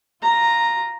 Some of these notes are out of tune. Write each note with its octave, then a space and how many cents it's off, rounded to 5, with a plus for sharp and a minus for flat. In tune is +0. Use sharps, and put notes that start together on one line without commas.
F4 +0 A#5 +0